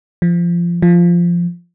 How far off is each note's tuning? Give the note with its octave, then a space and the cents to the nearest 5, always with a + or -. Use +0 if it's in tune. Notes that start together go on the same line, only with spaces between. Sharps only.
F3 -20
F3 -10